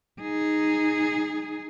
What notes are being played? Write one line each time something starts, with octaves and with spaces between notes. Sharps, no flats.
D#4 G#4